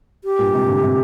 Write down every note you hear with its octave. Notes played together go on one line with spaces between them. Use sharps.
G4
G2 A#2
G#2 C3
A#2 D3
C3